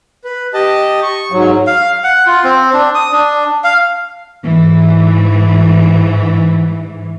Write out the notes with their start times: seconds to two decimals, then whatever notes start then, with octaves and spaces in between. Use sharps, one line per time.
0.24 B4
0.54 G4 D#5 A5
1.03 C#6
1.32 G#2 F#3
1.67 F5
2.04 F#5
2.26 F4
2.44 C4
2.73 D4
2.95 D#6
3.12 D4
3.64 F5
4.44 G#2 E3